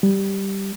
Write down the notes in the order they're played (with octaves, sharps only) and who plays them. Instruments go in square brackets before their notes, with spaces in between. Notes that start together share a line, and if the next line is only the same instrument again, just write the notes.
[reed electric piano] G3